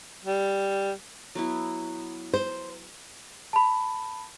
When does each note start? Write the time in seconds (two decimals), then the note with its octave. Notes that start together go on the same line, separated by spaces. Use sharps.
0.25 G3
1.35 F#3 B3 E4
2.34 C5
3.53 A5 B5